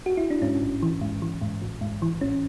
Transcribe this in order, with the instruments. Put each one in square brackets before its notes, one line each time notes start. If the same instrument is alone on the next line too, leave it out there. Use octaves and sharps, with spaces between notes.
[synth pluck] F#4
E4
D4
G#2 C#4
A1
E3
G#2
E3
G#2
A1
G#2
E3
A1 C#4